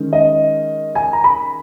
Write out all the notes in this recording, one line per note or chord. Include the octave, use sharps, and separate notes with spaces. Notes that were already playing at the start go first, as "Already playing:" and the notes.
Already playing: D#3 G#3 C#4
D#5
G#5
A#5
B5